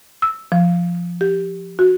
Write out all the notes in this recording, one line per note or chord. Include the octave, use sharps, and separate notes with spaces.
E6
F3
G4
F#4